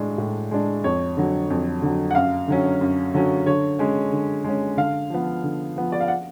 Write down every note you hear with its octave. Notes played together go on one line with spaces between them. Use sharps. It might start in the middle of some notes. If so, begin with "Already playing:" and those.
Already playing: A2 G#3 D4
A2
G#3 D4
F2 C#5
D3 F#3
F2
D3 F#3
F#5
F#2 F5
D3 F#3 C#4
F#2
D3 F#3 C#4
D3 C#5
G#3 C#4
D3
G#3 C#4
D3 F5
F3 B3
D3
F3 B3
D5
F5
F#5